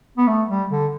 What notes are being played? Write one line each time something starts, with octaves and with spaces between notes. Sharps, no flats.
B3
A3
G3
D3